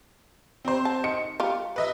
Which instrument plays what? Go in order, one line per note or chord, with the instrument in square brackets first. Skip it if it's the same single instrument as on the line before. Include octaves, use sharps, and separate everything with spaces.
[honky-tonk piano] C4 C5
[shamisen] A5
[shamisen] D#3 [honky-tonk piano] C#7
[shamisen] G3 F4
[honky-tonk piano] B4 D#5 E5